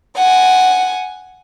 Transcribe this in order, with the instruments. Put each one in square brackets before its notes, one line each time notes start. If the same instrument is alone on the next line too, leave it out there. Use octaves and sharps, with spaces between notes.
[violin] F#5 G#5